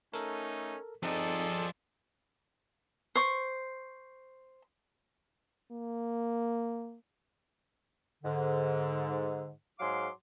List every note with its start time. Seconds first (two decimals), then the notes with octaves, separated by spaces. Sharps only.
0.14 A3 C#4 D#4 A4 A#4
1.03 F3 C4 D#4 G#4 A4 D5 D#5
3.16 C5 C#6
5.71 A#3
8.23 G#2 D3
9.80 G#2 F#3 G#4 F5 C6 D6